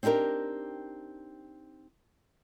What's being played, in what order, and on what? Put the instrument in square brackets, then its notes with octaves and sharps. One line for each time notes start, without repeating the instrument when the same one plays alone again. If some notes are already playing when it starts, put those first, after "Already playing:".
[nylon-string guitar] C4 D4 D#4 G4 A#4